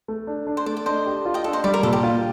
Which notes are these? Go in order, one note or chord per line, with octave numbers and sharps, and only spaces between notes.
A3
D4
D4
C5
A3 D5
D5
D4 C5 D#5
G4
F4
D#5 G5
D4 A4
C5 D#5
G3 D5
A#4
A#2 A4
G4
F4